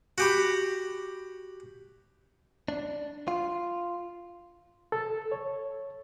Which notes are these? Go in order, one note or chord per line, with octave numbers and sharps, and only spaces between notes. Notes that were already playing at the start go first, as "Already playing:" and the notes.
F#4 G4 B5
D4
F4
A4
C#5